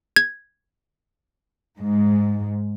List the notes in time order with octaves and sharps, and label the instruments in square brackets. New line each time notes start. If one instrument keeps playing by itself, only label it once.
[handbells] G#6
[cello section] G#2